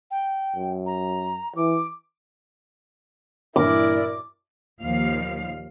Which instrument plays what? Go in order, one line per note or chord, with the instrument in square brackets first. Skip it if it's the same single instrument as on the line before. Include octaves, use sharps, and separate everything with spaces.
[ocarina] G5
[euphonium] F#2
[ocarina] A#5
[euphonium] E3 [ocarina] D6
[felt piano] G2 A#2 E3 [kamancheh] E4 D5 [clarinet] A#4 [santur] D6
[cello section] D#2 A#2 F3 F5